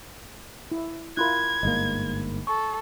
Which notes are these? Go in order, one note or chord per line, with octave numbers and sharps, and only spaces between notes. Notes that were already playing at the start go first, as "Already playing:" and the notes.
E4
E4 F4 A#4 B5 C6 F#6 G#6
G1 G#2 A#3 D#5
A4 C#6